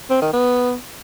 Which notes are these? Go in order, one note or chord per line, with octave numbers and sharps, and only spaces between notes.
C4
D#3
B3